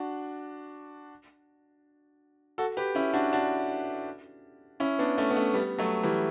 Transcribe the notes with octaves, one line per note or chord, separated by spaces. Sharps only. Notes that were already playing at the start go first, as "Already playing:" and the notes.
Already playing: D4 F#4
F#4 A4
G4 B4
C#4 E4
D4 F#4
D4 F#4
C#4 E4
B3 D4
A3 C#4
B3
A3 C#4
G3 B3
F#3 A3
E3 G3